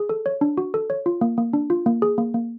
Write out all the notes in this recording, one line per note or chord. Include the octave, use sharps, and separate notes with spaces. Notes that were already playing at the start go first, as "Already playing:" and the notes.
Already playing: G#4
A4
C#5
D4
F#4
A4
C#5
F4
A#3
A#3
D4
F4
A#3
G#4
A#3
A#3